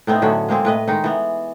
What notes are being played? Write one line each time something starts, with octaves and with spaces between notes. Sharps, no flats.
A2 B3 C4 D#4
A2 D3 F#3 C#4
G#3 A#3 C4 G#4
A2 B4 D#5
D#3 G#3 D#4
E3 B3